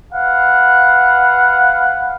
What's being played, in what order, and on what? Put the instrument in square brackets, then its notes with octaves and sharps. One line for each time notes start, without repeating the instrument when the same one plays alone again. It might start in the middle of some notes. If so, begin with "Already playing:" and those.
[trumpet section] B4 F5 F#5